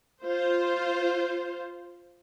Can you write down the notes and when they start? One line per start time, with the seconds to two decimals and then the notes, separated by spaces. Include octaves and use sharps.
0.24 F4 C5